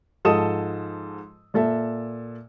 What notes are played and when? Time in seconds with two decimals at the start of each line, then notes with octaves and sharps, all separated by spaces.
0.25 G#2 F3 A4 D#5 D#6 E7
1.54 A#2 A4 E5